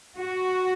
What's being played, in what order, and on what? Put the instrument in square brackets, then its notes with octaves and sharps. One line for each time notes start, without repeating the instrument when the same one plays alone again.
[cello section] F#4